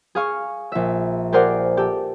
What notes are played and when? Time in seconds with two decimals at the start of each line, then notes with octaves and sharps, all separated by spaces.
0.15 G#4 F5 C#6
0.72 A#1 E5
1.32 G4 G#4 A#4 C5 D5 F#5
1.77 G4 A4